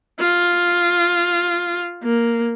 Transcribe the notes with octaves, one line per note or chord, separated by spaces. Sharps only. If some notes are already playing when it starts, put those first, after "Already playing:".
F4
A#3